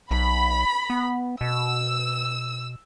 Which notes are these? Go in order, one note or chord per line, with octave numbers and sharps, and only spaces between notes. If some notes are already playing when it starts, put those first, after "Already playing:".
B1 B5
B3
B2 E6